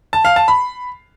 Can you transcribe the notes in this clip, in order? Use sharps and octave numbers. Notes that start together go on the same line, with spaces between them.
A5
F5
A5
B5